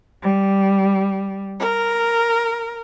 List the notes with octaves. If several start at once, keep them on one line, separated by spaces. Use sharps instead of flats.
G3
A#4